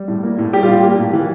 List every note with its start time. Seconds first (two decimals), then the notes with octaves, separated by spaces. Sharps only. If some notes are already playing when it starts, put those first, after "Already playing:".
Already playing: G3
0.08 A2
0.23 A#3
0.39 A2
0.53 G3 G4
0.63 F4
0.68 A2
0.73 G4
0.83 A#3
0.98 A2
1.13 E3